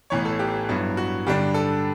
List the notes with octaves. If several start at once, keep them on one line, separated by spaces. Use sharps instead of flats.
A1 A2 E3 B3 C#5
A4
G4
G2 F#3 B3 E4
F#4
G2 D3 G3 D4 G4
A4